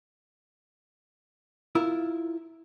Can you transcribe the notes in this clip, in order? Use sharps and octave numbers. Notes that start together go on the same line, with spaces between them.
E4 F4 A#4